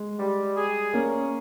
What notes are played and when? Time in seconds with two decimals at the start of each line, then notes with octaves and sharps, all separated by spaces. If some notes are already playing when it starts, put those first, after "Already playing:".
Already playing: G#3
0.19 G3
0.56 G#4
0.94 A#3 C#4